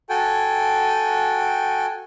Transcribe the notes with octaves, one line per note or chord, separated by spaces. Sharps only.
F#4 A4 G5 G#5